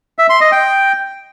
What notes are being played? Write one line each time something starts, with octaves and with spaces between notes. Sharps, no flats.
E5
C6
D#5
G5